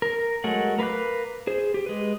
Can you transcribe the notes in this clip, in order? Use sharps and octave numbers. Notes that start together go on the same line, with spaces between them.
A#4
F#3 G#3 A3 A#4 F#5
A#4 B4 F5 D6 F#6
G#4 C5
G4
G#3 B4